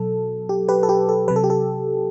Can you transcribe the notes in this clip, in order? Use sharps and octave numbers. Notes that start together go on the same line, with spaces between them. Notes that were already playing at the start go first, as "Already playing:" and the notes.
Already playing: B2 F#3 A4
G4
G4 B4
A4
G4
A4
C3 F#3 B4
A4
G4
A4